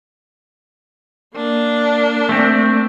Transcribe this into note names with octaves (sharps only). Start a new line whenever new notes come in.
A#3 D4
A3 C4